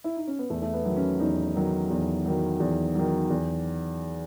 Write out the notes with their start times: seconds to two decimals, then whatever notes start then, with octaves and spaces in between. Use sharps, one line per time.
0.04 E4
0.16 D#4
0.27 C#4
0.39 B3
0.50 E2 A3
0.62 A3
0.73 B3
0.85 D#3 F#3
0.97 C#4
1.20 E2 D#4
1.55 D#3 F#3
1.90 E2
2.26 D#3 F#3
2.60 E2
2.95 D#3 F#3
3.30 E2